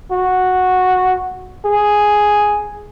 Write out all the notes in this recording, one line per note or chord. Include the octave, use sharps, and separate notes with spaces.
F#4
G#4